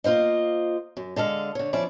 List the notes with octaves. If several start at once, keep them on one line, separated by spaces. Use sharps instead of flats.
A#3 F4 C5 D#5
F#2
D3 G#3 A4 F5
D3 C#5
F3 C#4 E4 D5